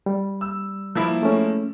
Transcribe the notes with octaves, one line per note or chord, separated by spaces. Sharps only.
G3
E6
F3 A#3 E4
G#3 A3 C#4